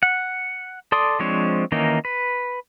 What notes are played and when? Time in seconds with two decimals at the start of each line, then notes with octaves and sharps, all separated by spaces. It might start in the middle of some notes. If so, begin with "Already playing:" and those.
0.03 F#5
0.92 A4 D5 C6 D#6
1.20 F3 G#3 C4 D4 C#5
1.72 D#3 E3 A#3 C#4 D#4
2.05 B4